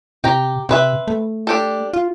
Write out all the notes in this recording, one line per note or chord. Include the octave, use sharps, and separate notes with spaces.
C3 G4 G5 A#5
C3 C4 B4 E5
A3
D4 G4 A4
F4